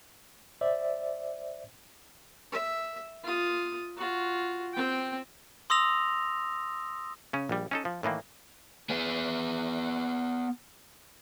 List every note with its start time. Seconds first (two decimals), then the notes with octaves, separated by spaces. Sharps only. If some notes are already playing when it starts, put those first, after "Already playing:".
0.61 C5 D5 E5
2.52 E5
3.24 F4 D#6
3.97 F4 F#4
4.74 C4 G5
5.70 C6 D#6 E6 A#6 F7
7.33 C#3 C#4
7.49 A#1 G3
7.71 C#4 D#4 A4
7.85 F3
8.03 A2 D#3 E3 A#3
8.90 B3 G#4